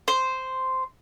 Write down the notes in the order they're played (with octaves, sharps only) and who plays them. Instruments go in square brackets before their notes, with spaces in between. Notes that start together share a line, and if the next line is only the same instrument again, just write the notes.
[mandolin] C5